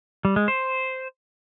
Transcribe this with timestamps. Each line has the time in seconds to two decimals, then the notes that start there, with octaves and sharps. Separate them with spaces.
0.25 G3
0.36 G#3
0.48 C5